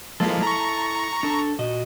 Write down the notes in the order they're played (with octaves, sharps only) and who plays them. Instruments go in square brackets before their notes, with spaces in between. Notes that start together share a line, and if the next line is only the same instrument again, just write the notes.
[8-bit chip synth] F3 G#3 A#3 [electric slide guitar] E4 A4
[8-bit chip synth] A#5 C#6
[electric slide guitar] D4 A4
A#2 F#4 D#5